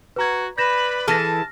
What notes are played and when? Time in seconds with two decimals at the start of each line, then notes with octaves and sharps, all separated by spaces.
0.16 F#4 B4 A#5 G#6
0.58 B4 D5 B5 G6 A#6 E7
1.08 E3 G#4 A4 A5 F6 A#6